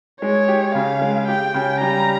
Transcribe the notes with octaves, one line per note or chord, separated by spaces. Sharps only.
G#3 C#5
G4
C#3 F5
G#3
G4 G5
C#3
G3 A#5